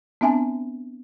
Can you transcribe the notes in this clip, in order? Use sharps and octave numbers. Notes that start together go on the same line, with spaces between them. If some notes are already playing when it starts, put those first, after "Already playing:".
B3 C4 D4 E5 G#5 A5